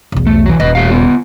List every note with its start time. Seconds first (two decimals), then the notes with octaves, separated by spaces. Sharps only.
0.12 B1 E2
0.27 A3
0.46 E3 F#3
0.60 D#1 B4 D#5
0.75 A3 G4 F5
0.90 B3 F4